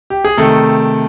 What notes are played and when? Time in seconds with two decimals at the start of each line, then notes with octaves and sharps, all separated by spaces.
0.10 G4
0.25 G#4
0.37 C3 D#3 A3 A4